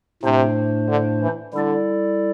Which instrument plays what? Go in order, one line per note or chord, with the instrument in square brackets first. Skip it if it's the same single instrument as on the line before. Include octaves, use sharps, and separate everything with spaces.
[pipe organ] A2 A3 D4 C5 [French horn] C3
[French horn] D3
E3
[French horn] D3 [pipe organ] G3 E4 A4 D5